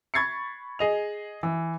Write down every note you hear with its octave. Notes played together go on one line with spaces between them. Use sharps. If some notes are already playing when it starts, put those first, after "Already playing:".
B5 C#6 G#6 A6 C7 C#7
G#4 D#5 F7
E3